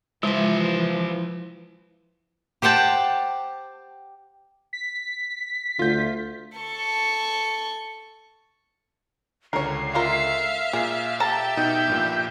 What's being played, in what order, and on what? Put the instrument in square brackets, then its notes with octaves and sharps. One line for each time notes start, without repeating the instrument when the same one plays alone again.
[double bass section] E3 F3 [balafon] G#3 E5 [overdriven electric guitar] E4 C5
[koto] G4 C5 F#5 G5 A5
[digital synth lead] B6
[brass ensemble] D2 [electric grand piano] F4 G6
[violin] A4 C#6
[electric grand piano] C#2 D3 [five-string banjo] A#4 C#5 [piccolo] C7
[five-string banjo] G#3 F4 A#4 [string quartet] E5 F5
[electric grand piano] A#2 [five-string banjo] G#4
[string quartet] G4 E5 [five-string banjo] A4 A5 A#5 [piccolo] A6
[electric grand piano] B2 D#4 [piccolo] G6
[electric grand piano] A#1 G2 A#2